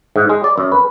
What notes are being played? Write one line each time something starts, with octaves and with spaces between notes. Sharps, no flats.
G#2
G#3
D5
F#2
B4